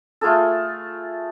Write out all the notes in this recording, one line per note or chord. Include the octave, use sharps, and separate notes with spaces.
A3 F4 G#4 A4